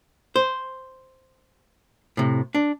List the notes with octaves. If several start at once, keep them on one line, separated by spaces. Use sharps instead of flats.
C5
A2 C3
D4